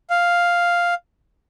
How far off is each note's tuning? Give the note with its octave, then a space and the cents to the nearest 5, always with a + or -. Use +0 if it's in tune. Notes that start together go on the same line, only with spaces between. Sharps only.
F5 +0